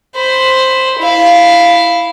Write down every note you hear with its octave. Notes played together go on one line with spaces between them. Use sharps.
C5 B5
E4 F5